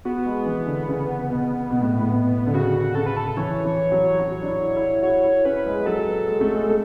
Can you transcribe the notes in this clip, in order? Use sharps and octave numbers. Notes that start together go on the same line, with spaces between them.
B3 F#4
G#3
E3
D3
C#3
B2
B2
A2
A2
B2
D3
C#3 F#4
C#3 A4
B4
A4
E3 C#5
E3
F#3
F#3
D4
E4
E4
F#4 C#5
E4
C#4 B4
G#3
G#3
F#3 A4
G#3
A3
G#3
A3